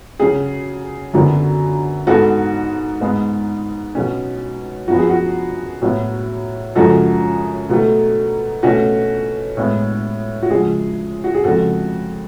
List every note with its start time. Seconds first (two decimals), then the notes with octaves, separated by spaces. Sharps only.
0.20 C#3 F#3 C#4 G#4
1.13 F#2 D3 F#3 B3
2.07 G#2 G#3 B3 F#4 A4
3.01 G#2 G#3 B3
3.95 B2 F#3 C#4
4.88 F#2 F3 B3 F#4
4.98 G#4
5.09 F#4
5.82 A2 F#3 B3
6.75 F#2 C#3 F3 G#3 F#4 A4
7.69 B2 F#3 A3
8.63 B2 A3 C#4 F#4
9.57 A2 G#3 B3
10.43 F#4
10.50 C#3 F3 G#3 G#4
11.24 F#4
11.34 G#4
11.44 F2 C#3 G#3 F#4 A4